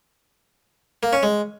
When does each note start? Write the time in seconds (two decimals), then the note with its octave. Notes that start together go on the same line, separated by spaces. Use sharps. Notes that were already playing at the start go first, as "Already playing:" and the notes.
1.03 A#3
1.13 C#4
1.23 G#3